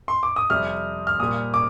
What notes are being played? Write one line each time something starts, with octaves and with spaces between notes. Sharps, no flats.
C6
D6
D#6
F2 C3 G3 F6
F6
A#2 G3 D#6
D6